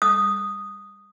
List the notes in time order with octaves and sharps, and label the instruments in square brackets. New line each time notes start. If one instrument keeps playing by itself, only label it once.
[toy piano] D#6